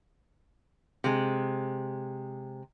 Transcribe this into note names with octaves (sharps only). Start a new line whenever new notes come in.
C3 G#3